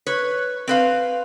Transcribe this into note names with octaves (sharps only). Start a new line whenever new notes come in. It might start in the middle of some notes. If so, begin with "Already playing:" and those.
B4 C#5
C4 B4 F5